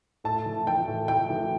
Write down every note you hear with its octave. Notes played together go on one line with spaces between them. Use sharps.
A2 A5
E3
E3 G5
A2
A2 G5
E3